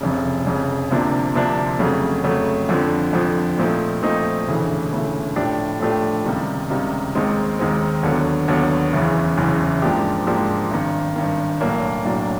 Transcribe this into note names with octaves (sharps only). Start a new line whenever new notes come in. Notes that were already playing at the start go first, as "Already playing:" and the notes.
F1 F2 C#3
F1 F2 C#3
D2 C3 F3 A#3 D4
D2 C3 F3 A#3 D4
F2 C#3 F#3 A3
F2 C#3 F#3 A3
F2 D3 F3
F2 D3 F3
A#2 F3 A3 C4 D#4
A#2 F3 A3 C4 D#4
E1 D2 C#3 E3 A3
E1 D2 C#3 E3 A3
A2 F3 A3 D4 G4
A2 F3 A3 D4 G4
C#2 C3 D#3 G3
C#2 C3 D#3 G3
D#2 D#3 G#3 C4
D#2 D#3 G#3 C4
D#2 D3 F#3 B3
D#2 D3 F#3 B3
F#1 E2 C#3 E3
F#1 E2 C#3 E3
G#2 F3 A#3 D4 G4
G#2 F3 A#3 D4 G4
G#1 G2 D#3
G#1 G2 D#3
B1 A2 F#3 A#3 D4
B1 A2 F#3 A#3 D4